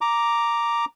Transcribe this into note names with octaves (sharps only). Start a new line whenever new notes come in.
A#5 D6